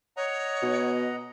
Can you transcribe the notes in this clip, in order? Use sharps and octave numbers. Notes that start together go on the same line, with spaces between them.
C#5 D#5 F#5 A#5
B2